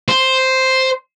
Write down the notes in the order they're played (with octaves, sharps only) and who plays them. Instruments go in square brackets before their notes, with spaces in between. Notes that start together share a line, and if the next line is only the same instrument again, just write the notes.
[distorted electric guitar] C5